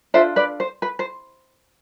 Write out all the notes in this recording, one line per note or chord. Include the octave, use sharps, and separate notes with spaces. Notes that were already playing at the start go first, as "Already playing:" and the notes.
D4 F4 A4 C5 E5
B4 D5
C5
B4
C5